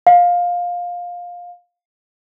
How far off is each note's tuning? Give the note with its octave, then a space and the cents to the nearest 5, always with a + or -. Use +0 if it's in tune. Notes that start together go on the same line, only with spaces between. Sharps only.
F5 +15